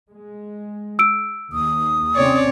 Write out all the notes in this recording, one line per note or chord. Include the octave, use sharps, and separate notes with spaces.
G#3
E6 D7
D#2 D#6
C3 C4 C#4 C#5 D5